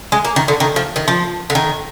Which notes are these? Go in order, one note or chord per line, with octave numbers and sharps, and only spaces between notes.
G#3
A#3
D#3
D3
D#3
F3
D#3
F3
D3
D#3